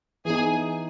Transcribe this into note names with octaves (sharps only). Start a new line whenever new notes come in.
E3 B3 D#4 G#4